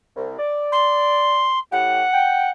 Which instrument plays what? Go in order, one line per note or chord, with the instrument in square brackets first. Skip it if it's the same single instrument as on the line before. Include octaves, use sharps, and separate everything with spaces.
[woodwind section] C2
D5
[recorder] C6
[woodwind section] A2 G4 [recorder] F#5
[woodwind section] G5